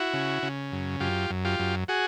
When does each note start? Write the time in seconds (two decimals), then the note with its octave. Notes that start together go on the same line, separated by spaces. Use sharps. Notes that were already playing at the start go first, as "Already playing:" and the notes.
Already playing: E4 F#4
0.13 C#3
0.43 C#3
0.72 F#2
1.00 F#2 F4 G4
1.30 F#2
1.45 F4 G4
1.59 F#2
1.88 F#4 G#4